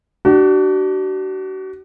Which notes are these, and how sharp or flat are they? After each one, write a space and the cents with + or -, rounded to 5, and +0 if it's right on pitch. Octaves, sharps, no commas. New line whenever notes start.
D4 +15 F#4 +40